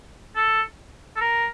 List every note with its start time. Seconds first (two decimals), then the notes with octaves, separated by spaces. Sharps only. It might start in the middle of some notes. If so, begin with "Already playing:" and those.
0.36 A4
1.16 A4
1.21 A#4